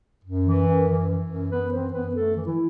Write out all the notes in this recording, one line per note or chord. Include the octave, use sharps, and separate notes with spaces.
F#2
E3
F#2
E3
E3
F#2
F#2 B3 B4
E3 C4 C5
F#2 B3 B4
E3 A3 A4
E3
E3 E4